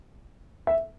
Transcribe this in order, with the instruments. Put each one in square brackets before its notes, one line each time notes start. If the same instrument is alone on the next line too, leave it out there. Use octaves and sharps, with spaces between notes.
[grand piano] E5